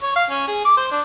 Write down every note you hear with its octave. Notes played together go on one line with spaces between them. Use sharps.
C#5
F5
C#4
G#4
D6
C5
D4